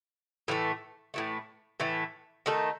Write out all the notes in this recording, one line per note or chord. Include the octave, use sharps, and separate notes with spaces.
A2 E3 A3
A2 E3 A3
A2 E3 A3
D#3 A3 D#4 A4